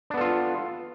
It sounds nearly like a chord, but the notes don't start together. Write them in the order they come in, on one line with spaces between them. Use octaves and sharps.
D4 B3 A4 F4